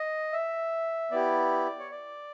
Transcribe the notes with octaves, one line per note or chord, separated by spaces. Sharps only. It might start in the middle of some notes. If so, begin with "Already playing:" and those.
Already playing: D#5
E5
B3 E4 G4 D5
C#5
D5